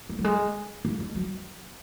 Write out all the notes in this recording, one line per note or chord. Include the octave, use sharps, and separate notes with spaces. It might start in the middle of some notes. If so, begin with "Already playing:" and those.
A#3
F#3
G#3
A#3
G#3
F#3